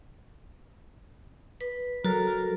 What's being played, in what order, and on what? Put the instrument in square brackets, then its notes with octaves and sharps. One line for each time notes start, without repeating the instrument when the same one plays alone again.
[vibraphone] B4
[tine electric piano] F#3 [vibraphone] F#4 A4 [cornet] A#4